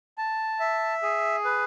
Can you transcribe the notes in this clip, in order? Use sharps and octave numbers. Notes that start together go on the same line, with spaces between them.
A5
E5
G#4
B4